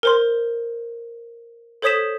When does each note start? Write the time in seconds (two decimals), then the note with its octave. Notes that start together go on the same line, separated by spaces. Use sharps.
0.03 A#4 C5 C6
1.82 A4 C5 C#5 D#6 B6 E7